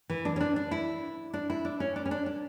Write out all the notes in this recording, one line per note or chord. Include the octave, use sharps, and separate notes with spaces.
E3
D4
C#4
D4
D4
E4
D4
E4
D4
C#4
D4
C#4
D4
D4